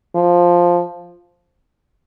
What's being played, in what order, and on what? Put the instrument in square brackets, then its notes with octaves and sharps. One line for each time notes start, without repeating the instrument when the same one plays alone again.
[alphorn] F3